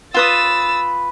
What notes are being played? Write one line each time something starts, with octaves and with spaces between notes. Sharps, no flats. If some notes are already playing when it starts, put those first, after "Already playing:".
F4 B4 D#6 E6 A6